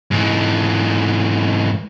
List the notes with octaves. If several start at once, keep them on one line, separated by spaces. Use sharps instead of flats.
G#2 E3